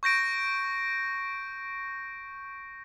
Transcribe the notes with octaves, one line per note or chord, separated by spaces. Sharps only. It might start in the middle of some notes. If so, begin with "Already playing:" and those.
C#6 G6 A#6 D7